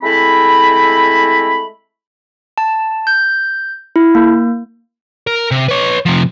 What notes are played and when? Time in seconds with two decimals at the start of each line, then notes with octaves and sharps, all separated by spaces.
0.02 G#3 A3 C4 E4 B5
2.58 A5
3.07 G6
3.96 E4
4.15 A#3
5.27 A#4
5.51 C3
5.69 B4 C#5
6.06 C3 F3